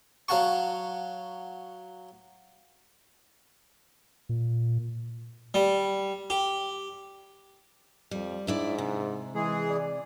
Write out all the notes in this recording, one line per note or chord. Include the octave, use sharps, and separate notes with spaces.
F#3 F5 F#5 A5 C#6
A#2
G3
G4
F2 G3
G#2 D4 E4 D5
C3
E3 G#3 G#4
D5